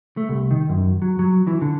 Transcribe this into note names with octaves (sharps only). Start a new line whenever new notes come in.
A3
C2
D#3
F#2
F#3
F#3
E3
D3